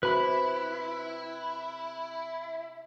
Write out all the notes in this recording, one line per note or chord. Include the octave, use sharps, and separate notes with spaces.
C3 E4 F#4 B4 B5 C6